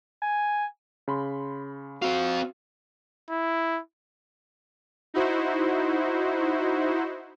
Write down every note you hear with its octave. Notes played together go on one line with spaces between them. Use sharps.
G#5
C#3 B5 C6
C4 F#4 F5
E4
D#4 E4 F#4 C5